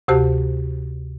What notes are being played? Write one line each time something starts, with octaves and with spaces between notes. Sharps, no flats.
D2 C3 F#4 G4 C5 A5